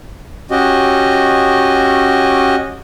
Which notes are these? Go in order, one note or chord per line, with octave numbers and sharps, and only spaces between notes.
C#4 F#4 G4 D#5